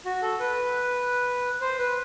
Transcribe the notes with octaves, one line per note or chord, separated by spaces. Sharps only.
F#4
A4
B4
C5
B4